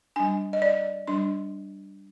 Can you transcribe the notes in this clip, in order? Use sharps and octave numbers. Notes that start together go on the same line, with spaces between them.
G3 D4 G#5
D#5
D5
G3 D4 C6